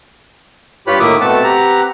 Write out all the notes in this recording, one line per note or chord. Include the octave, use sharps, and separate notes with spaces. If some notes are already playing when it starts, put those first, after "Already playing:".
G2 F4 G4 B4 C#5 B5
A2 D#3 A#3 E5 D6 D#6
B2 A3 C4 B4 F#5 A5
G4 A#5